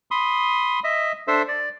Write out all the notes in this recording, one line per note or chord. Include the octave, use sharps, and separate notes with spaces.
B5 C6 D#6
D#5 E5
D4 A4 C5 E5
D5